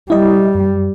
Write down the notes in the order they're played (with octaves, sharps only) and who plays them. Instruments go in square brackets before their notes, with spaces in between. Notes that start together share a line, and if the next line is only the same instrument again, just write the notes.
[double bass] G3 [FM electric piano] E4 D#5
[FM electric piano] F#2